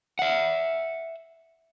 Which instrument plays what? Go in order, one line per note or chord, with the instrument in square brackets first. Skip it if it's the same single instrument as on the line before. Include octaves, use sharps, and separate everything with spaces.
[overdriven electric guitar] E5 F#5